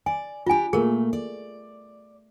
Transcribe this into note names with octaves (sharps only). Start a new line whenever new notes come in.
D5 G#5
D4 F4 G4 G#5
A#2 A3 G#4 A#4
D5